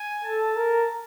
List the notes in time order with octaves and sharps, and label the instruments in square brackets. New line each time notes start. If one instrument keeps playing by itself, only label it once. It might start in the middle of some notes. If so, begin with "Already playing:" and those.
Already playing: [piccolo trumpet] G#5
[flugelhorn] A4 [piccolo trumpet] A5
[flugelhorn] A#4